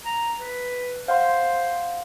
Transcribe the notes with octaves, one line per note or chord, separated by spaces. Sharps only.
A#5
B4
C5 F5 F#5 C6